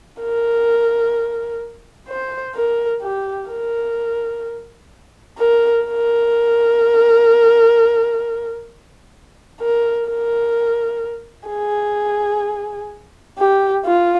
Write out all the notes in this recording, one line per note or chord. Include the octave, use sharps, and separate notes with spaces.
A#4
C5
A#4
G4
A#4
A#4
A#4
A#4
A#4
G#4
G4
F4